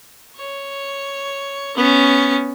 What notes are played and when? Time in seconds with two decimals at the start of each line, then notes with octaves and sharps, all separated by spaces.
0.37 C#5
1.77 B3 C#4